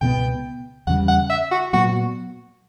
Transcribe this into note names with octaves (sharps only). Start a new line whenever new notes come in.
C#2 B2 F#3 B3 G5
E2 C#3 G3 F#5
F#5
E5
F#4
A#2 F#3 B3 F#4